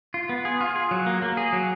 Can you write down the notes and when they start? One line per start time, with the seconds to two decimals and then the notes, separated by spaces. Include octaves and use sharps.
0.14 F4
0.29 B3
0.45 G#4
0.61 F4
0.76 G#4
0.91 F#3
1.06 A#3
1.22 A#3
1.37 G#4
1.53 F#3